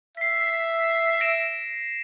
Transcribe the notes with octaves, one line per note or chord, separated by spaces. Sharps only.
E5 B6 C7
A#6 D7 E7